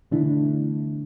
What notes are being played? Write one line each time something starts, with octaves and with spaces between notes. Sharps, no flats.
B2 D3 E3 A3 D4 E4